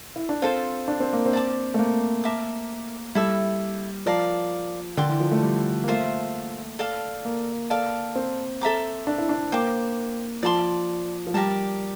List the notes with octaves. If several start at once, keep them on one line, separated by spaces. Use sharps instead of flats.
E4
D4
C4 F4 A4 C5
D4
C4
A#3
C4
D5 A5 D6
A3
A#3
A#4 E5 A5 D6
G3 E4 A4 E5
F3 A#4 D5 F5 A5
D3 D5 G5 C6
E3
F3
A3
G3
A#3
A3 F4 C5 E5
A4 D5 F5 A5
A#3
A4 D5 F5 A5
C4
A4 E5 A#5 D6
D4
E4
D4
A#3 C5 G5 D6
F3 D5 A5 C6
F3
G3 G4 A#4 D5 A5